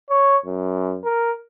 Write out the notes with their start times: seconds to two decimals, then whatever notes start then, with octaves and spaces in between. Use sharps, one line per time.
0.10 C#5
0.45 F#2
1.04 A#4